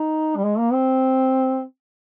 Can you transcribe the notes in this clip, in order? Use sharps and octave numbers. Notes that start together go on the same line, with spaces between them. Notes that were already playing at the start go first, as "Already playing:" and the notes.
Already playing: D#4
G3
G#3
A#3
C4